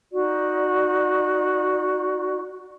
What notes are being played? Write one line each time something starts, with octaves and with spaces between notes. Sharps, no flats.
D#4 F#4 D5